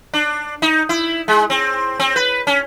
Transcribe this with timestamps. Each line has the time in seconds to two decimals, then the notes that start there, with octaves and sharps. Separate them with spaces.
0.14 D4
0.62 D#4
0.89 E4
1.28 G#3
1.50 C4
2.00 C4
2.16 B4
2.47 C#4